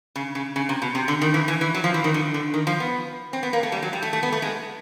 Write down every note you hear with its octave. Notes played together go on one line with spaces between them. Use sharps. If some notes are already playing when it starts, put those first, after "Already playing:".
C#3
C#3
C#3
C3
B2
C3
D3
D#3
E3
E3
E3
F#3
F3
E3
D#3
D3
D3
D#3
F3
B3
C4
B3
A#3
A3
G3
F#3
G3
A3
A3
B3
A3
G#3